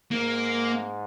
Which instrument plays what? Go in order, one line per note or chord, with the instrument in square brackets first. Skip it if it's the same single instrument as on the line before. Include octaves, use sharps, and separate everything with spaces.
[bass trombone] G#2 [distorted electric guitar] A#3